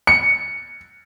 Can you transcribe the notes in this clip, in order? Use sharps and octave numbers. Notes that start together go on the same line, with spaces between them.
C#7